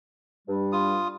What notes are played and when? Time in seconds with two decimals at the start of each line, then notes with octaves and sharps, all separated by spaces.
0.48 G2 G3
0.72 F4 D#6